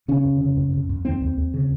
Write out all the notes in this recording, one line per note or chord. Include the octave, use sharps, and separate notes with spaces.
C#3 C#4
F2
C#3
F2
F2
F2
D#2 C4
D#2
D#2
C#3